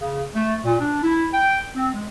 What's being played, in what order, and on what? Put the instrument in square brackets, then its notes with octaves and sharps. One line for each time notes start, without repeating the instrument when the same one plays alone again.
[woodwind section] C#3
A3
A#2
D4
E4
G5
C4
G#3